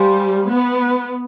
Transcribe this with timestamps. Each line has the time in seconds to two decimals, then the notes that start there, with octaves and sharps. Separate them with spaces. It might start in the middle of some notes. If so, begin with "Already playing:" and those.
Already playing: G3 C5 F5 G#5 C6
0.48 B3